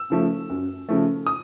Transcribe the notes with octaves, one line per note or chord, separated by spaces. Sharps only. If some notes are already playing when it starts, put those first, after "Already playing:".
Already playing: E6
C#3 F3 A3
F#2
C#3 F3 A3
D#6